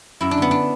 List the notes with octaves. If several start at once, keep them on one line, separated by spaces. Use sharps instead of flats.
F#2 E4
D4
D3 B3
D4